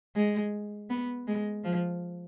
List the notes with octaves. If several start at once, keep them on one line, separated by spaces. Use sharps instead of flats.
G#3
B3
G#3
F3